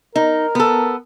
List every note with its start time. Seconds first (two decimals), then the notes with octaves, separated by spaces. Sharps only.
0.16 D#4 A#4
0.55 B3 A4